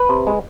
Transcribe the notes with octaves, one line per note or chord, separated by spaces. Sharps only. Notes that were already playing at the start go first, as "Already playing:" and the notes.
Already playing: B4
C3
G#3